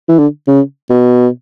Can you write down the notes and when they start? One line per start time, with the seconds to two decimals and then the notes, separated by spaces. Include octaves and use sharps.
0.08 E3
0.18 D3
0.48 C#3
0.90 B2